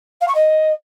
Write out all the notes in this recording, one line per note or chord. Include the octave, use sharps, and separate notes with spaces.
F5
C#6
D#5